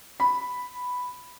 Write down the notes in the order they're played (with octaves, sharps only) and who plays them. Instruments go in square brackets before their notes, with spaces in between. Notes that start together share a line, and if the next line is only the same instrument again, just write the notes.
[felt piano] B5